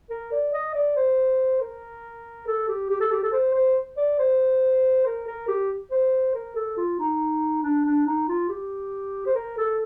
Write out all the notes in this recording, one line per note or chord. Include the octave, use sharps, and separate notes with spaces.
A#4
D5
D#5
D5
C5
A#4
A4
G4
G4
A4
G4
A4
C5
C5
D5
C5
A#4
A#4
G4
C5
A#4
A4
F4
D#4
D4
D4
D#4
F4
G4
C5
A#4
A4